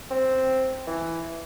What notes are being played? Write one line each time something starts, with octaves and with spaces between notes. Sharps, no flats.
C4
E3